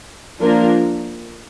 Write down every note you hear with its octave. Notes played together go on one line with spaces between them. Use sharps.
F3 A#3 D4 F4 A#4